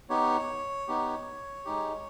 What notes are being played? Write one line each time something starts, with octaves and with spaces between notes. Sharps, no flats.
B3 D#4 G4 C#5
B3 D#4 G4
G#3 D#4 G4